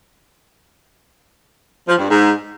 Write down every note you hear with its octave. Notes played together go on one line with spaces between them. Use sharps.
F3
G2
G#2